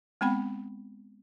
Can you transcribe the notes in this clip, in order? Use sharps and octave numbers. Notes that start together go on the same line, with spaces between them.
G#3 B3 C4 F#5 G5 B5